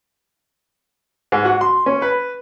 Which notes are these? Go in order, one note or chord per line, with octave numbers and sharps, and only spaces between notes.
G#2
F#4
C6
C#4
B4